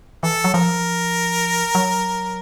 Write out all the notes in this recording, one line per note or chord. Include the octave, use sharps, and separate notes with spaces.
E3 A4
F#3
F3 A#4
F#3